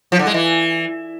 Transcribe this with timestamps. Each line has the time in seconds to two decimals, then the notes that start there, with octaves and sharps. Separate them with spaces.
0.12 F3
0.19 D3
0.27 G#3
0.34 E3